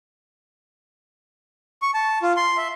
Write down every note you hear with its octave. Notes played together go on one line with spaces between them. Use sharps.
C#6
A5
F4
C6
E5